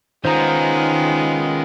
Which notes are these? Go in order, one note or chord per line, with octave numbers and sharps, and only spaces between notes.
D#3 G#3 B3 C#4 F4 C5 A#5